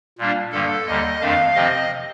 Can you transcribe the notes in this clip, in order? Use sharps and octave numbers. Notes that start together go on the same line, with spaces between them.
A#2 G3 A#3 D4
G2 D3 G3 A#3 A4
D#2 D3 G3 D#5
F2 D#3 A3 D4 F5
C3 F3 C4 D#5